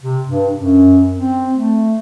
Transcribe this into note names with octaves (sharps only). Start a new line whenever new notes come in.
C3
G2
F#2
C4
A3